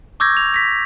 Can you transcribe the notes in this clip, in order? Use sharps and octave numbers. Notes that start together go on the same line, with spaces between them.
C#6 D6 E6 G6 G#6 A#6
F7
A#6 B6